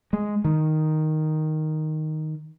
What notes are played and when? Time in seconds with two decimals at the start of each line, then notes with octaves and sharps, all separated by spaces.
0.13 G#3
0.45 D#3